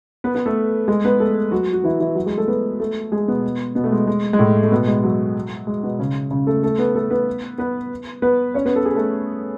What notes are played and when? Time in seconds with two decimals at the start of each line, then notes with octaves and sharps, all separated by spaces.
0.24 B3 B4
0.35 B3 B4
0.46 A3 A4
0.88 G#3 G#4
1.05 B3 B4
1.20 A3 A4
1.51 F#3 F#4
1.73 F#4
1.84 E3 E4
2.00 E3 E4
2.15 F#3 F#4
2.26 G#3 G#4
2.37 A3 A4
2.48 B3 B4
2.80 A3 A4
3.12 G#3 G#4
3.28 B2 B3
3.75 B2 B3
3.84 A3
3.92 G#3
4.07 G#3
4.33 G#3
4.39 A2 A3
4.63 A3
4.71 B2 B3
4.87 G#3
5.04 F#3
5.67 G#3
5.83 B2 B3
5.99 C#3 C#4
6.31 C#3 C#4
6.47 A3 A4
6.63 A3 A4
6.78 B3 B4
6.95 A3 A4
7.10 B3 B4
7.58 B3 B4
8.22 B3 B4
8.54 C#4 C#5
8.66 B3 B4
8.76 A4
8.86 G#4
8.95 A3 A4